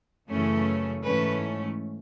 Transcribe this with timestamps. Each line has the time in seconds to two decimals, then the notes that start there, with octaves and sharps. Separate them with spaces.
0.28 F#2 C#3 E3 A3 C#4
1.04 G#2 E3 A3 C#4 B4